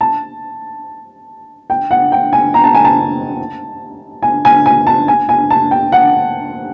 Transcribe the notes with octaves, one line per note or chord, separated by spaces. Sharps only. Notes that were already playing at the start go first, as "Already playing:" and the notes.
A5
G5
F#5
G5
G#5
A#5
A5
G#5
A5
G#5
G#5
G#5
A5
G#5
G#5
A5
G5
F#5